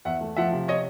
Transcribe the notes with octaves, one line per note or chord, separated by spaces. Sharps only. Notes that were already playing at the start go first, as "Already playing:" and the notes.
E2 E5 F#5
A3
F3 E5 F#5
C3
C#5 D#5